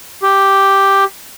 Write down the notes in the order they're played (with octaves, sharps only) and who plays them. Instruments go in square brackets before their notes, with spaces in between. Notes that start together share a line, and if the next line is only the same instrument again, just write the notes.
[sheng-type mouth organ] G4